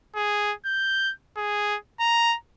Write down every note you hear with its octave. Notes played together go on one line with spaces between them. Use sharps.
G#4
G6
G#4
A#5